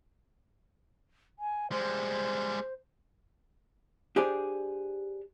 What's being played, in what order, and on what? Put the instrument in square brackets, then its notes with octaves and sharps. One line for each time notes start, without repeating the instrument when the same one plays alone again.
[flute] G#5
[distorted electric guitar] G3 G#3 [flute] C5
[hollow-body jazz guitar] D4 G4 G#4 C5 D5